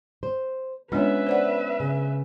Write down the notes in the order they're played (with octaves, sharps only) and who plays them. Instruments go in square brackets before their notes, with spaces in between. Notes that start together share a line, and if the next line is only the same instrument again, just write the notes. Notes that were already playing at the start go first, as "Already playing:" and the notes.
[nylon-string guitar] C5
[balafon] G#3 D4 F4 [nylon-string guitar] B3 C#4 [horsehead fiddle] B4 E5
[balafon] C5 D5 F#5
[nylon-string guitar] C#3